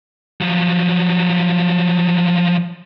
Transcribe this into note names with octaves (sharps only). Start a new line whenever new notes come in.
F3 F#3